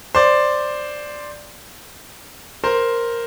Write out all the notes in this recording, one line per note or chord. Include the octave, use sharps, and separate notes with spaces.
C5 D5
A#4 C5